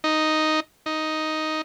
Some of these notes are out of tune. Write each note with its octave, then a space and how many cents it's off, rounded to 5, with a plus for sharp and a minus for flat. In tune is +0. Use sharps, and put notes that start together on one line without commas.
D#4 +0
D#4 +5